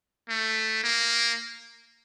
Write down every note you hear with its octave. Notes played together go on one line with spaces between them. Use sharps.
A3
A#3